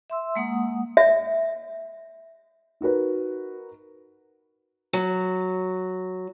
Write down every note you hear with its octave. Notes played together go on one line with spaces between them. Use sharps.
E5 C6 E6
G#3 A#3 F#5 D#6
E5
D#4 F#4 A#4 B4
F#3